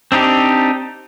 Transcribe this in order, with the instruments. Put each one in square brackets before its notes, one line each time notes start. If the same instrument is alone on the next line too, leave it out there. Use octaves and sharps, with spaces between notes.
[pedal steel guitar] C4 D4 D#4 G4